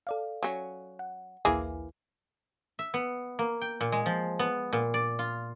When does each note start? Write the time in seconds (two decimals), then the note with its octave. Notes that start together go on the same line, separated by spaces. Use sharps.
0.07 A4 D5 F5
0.43 F#3 C#4
0.99 F#5
1.45 A#1 D#2 E3 A#3 E4 G#4
2.79 E5
2.94 B3
3.39 A#3
3.61 G5
3.81 A#2
3.92 G#3
4.06 F3
4.39 B3
4.73 A#2
4.94 D5
5.19 F4